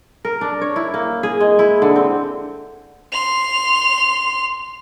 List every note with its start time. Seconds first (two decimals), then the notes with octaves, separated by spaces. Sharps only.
0.25 A#4
0.41 D4
0.61 C#5
0.76 E4
0.94 A#3
1.23 G#4
1.40 G#3
1.59 E4
1.82 D3
1.96 C4
3.12 C6 F7